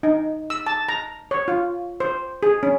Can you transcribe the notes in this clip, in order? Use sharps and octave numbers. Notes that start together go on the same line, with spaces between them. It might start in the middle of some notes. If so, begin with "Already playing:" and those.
D#4
E6
A5
A#5
C#5
F4
C5
G#4
C#4